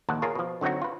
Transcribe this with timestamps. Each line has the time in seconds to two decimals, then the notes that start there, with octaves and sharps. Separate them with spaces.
0.09 A#1 D#2 F#5 A5
0.22 F4 G#4 A#4 C#5
0.35 B2 F3
0.61 D3 F#3 C4 D#4 F#4
0.82 F4 B4